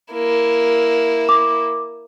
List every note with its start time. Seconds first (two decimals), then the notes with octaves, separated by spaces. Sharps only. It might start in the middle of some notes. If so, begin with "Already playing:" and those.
0.13 A#3 E4
1.29 D6